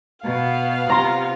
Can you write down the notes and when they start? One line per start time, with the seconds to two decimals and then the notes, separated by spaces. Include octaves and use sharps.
0.24 B2 B3 F5
0.90 C3 F4 A#5 C6